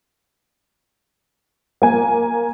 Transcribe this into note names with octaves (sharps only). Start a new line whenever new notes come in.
A#3 G#5